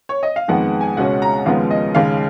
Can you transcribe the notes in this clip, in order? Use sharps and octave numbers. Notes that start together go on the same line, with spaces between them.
C#5
D#5
F5
F2 D#3 G#3 B3 F#5
G#5
C#2 B2 G#3 C#4 F#5
A#5
D#2 C#3 F3 G#3 B3 F5
D#5
D#2 C#3 G#3 F5